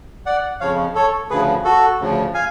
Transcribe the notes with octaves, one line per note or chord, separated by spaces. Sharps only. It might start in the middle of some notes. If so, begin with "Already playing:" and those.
D5 F#5
F2 C#3 F3 C#5 F5
A4 C#5
D2 C#3 F3 G#4 B4
F#4 A4
D2 C#3 F3
F5 G#5